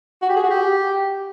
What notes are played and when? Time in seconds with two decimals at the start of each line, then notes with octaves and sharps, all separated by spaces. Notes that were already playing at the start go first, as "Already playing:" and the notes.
0.22 F#4
0.29 G4
0.36 G#4
0.43 F#4
0.50 G4